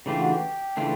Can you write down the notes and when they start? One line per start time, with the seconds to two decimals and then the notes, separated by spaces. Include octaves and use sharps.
0.06 C#3 E3 A3 D4 F4 G4
0.19 F#4
0.31 G4
0.77 C#3 E3 A3 D4 F4